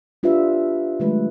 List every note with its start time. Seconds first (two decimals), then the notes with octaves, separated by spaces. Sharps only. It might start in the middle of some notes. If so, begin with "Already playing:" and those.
0.23 D4 F4 G4 B4 E5
1.00 D#3 F#3 G#3 A3 B4